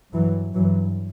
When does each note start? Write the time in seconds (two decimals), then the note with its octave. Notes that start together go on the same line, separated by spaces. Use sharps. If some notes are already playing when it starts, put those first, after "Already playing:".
0.14 G2 E3 F#3
0.54 G2 E3 F#3